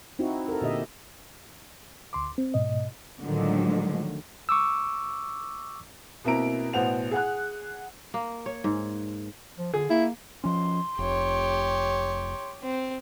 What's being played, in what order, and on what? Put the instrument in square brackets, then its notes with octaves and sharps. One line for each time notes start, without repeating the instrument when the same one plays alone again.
[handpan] C4 D#4 E4 F#4
A4 A#4
A#2 D3 G4 D#5 E5
[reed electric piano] D2 C6 D6
C4
G#2 B2 D#5
[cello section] A2 D3 D#3 F3 F#3 G#3
[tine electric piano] C#6 D6 E6
[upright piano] B2 A#3 C4 E4 A#5 D7
A1 B2 B3 C5 F#5 F7
G#4 F#5 F#6
[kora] A#3
C#5
G#2
[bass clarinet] F3
[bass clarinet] D3 [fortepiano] G#4
[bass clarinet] A#3 [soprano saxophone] E4
[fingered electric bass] F3 C#4 [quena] C6
[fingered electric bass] F1 [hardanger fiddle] G4 C#5
[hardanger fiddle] C4